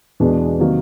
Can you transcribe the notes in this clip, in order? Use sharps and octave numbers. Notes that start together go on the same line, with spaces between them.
E2 B2 G#3 B3 D4
C3 D#3 F#3 A#3